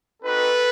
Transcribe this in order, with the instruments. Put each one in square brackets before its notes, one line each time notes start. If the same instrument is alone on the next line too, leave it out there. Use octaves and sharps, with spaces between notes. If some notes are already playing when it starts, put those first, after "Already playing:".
[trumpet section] C4 D#4 F#4 A4 B4